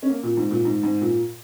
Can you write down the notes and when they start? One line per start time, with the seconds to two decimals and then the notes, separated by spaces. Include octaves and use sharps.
0.02 C#4
0.10 A#3
0.23 A#2
0.37 G#2
0.51 A#2
0.65 G#2
0.83 G#2
1.01 A#2